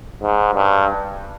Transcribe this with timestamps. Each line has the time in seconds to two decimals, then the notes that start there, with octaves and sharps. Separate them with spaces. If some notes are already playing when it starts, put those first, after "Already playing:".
0.22 G#2
0.54 G2